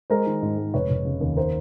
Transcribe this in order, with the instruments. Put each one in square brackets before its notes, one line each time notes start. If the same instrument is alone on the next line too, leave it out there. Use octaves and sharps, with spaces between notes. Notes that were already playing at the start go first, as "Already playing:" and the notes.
[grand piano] G#3 A#4 C5
D#3
G#2
G#3
F1 B4 C#5
F1
C#3
D#2
A#4 C5